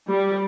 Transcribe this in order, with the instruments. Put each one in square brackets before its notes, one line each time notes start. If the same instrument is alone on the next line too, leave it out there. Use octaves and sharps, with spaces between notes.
[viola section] G3